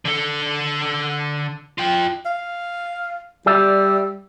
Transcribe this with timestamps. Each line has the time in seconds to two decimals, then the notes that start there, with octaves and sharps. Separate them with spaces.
0.05 D3 A4
1.78 F4 G5
2.26 F5
3.46 G3 G4 D5 E5